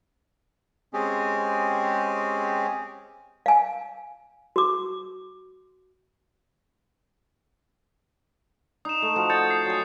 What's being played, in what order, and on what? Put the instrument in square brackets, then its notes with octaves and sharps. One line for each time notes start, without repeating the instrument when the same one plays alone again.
[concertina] G#3 C4 C#4 G4 G#4
[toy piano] F5 G#5
F#4 D6
[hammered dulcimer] D#4 [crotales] D#6 E7
[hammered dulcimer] A3
F3 F#4
[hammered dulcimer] D#5 A5 [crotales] G6 A6 C#7
[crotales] C7
[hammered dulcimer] F#3 G#5